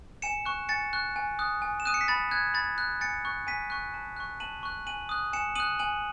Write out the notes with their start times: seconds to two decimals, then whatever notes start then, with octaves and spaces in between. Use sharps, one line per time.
0.22 G#5 C#7 E7
0.45 C#6 F#6
0.69 G#5 A6 C#7
0.93 C#6 F#6
1.16 G#5
1.39 D#6 F#6
1.62 G#5
1.80 E7
1.86 D#6 F#6 D#7
1.94 C#7
2.01 B6
2.08 B5 A6
2.31 F#6 G#6
2.54 B5 A6
2.78 F#6
3.01 G#5 A6 C#7
3.25 C#6 F#6
3.47 G#5 B6 D#7
3.70 C#6 F#6
3.94 A5
4.16 C#6 F#6
4.40 A5 D#7 F#7
4.63 C#6 F#6
4.87 G#5 D#7 F#7
5.09 D#6 F#6
5.33 G#5 C#7 E7
5.55 D#6 F#6 D#7 F#7
5.79 G#5 D#7 F#7